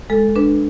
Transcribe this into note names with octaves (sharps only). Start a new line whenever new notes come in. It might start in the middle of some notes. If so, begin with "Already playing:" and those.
G#3 A4
D4 B4